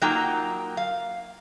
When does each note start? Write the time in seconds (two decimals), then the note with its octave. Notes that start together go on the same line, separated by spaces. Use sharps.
0.01 F#3 A#3 D#4 F4 G5 A#5
0.77 F5